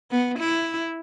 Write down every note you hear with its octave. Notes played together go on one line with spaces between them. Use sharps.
B3
E4